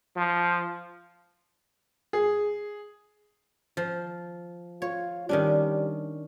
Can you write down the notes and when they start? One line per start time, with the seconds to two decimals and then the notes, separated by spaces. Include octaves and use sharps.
0.17 F3
2.13 G#4
3.77 F3
4.82 F4 C#5
5.29 D#3 G3 C#4 D4